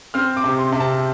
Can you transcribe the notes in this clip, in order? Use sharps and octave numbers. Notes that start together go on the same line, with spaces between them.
C4 F6
D6
C3
C6
C3
A5